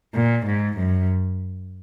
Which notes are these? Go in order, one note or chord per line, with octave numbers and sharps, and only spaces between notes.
A#2
G#2
F#2